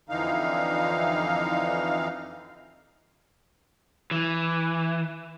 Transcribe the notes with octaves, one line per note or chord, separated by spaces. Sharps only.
F2 D3 E3 D#4 F5
E3